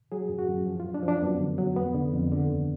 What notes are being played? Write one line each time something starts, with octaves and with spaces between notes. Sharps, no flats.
F#3 G#4
F#2
F#4
F#2
F3
F4
F#2
D4
F3
D4
F#2 B3
D3
F#3
F2 B3
D3
F2
D3
D#2